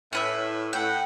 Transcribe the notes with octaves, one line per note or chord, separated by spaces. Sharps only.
A2 C#4 B4 E5
A2 F#5 G5